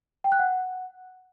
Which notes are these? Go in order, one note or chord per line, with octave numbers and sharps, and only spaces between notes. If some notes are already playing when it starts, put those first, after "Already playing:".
G5
F#6
F#5